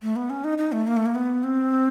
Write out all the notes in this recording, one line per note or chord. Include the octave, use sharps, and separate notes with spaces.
A3
B3
C#4
D#4
D#4
A3
A#3
A3
A#3
B3
C4